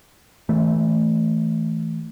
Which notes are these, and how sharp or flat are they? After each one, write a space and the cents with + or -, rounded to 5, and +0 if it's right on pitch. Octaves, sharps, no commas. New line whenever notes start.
E3 -20 A3 +0